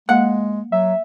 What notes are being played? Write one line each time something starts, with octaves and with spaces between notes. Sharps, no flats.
G#3 A#3 F#5
F#3 E5